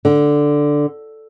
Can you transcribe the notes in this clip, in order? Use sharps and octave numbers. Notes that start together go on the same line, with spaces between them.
D3